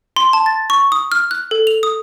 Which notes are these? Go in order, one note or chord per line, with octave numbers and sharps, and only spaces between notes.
C6
A5
A6
C#6
D#6
F6
F#6
A4
F7
D#6